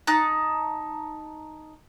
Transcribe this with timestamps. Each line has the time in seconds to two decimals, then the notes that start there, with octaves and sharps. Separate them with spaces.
0.07 D#4 A5 F#6